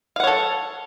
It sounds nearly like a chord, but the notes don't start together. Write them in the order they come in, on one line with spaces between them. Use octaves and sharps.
F5 F#5 C#5 A4